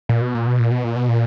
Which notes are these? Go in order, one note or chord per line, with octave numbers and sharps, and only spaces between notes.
A#2
B2
A#2
B2
A#2
B2
A#2
B2
A#2